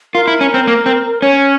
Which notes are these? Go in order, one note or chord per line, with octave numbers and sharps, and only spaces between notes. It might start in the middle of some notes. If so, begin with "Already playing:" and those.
F4 A#4
E4
C#4
C4
A#3
C4
C#4 C#5